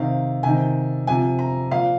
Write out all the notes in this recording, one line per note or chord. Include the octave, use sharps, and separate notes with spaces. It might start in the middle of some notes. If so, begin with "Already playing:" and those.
Already playing: C3 D#3 F5
C3 D#3 G#5
C3 F3 G#5
A#5
A#2 F3 F5